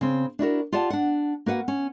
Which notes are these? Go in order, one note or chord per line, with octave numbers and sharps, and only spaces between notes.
C#3 C4
D4 E4 F#4 A#4
F4 G4 D5 F#5 A5
D4 F#5
A#3 F#4 B4 F#5
C#4